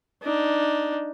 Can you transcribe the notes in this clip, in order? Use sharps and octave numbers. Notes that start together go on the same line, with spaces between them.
D4 D#4